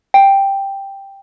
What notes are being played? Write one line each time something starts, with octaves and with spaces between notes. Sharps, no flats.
G5